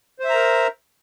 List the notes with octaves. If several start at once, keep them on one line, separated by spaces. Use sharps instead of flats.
A#4 C5 E5 A#5